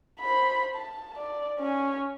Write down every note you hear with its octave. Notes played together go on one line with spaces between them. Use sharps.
C5 B5
A5
D5
C#4 G#5